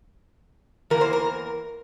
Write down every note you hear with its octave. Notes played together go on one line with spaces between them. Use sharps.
E2 E3 A#3 A#4
C5
A#4